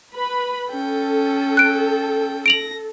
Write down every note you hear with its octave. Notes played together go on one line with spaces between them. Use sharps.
B4 B5
C#4 A4 G5
F#6 D7
A#6 D7 F7 F#7